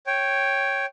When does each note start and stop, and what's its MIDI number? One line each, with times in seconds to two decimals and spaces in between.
0.07 0.86 73
0.07 0.86 79